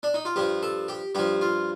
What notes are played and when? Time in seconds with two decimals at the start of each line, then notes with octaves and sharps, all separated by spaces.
0.03 D4
0.14 D#4
0.25 F4
0.36 G2 F3 G4
0.63 A4
0.88 G4
1.15 G2 F3 G4
1.41 F4